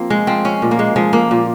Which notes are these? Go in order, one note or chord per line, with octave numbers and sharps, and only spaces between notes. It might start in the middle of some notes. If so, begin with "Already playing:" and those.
Already playing: F3 A#3 C4
G#3
F3 C4
C#4
A#2
A#3
G#3
F3 G#3
A#3
A#2